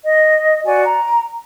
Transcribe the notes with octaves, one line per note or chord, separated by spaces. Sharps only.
D#5
F#4 D5 G#5
A#5